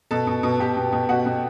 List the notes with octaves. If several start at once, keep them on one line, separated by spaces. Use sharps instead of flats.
B2 A4 A5
B2
B2
B2 G4 G5
B2
B2
B2 F#4 F#5
B2